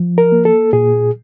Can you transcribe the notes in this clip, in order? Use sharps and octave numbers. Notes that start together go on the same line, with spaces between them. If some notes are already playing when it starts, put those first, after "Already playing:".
Already playing: F3
A#4
A#3
A4
A#2 G#4